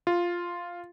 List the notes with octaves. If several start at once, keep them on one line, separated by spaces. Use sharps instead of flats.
F4